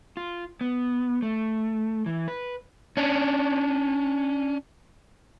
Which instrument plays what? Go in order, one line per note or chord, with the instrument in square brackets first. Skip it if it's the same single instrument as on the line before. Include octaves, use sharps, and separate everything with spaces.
[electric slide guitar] F4
B3
A3
E3
B4
C#4 D4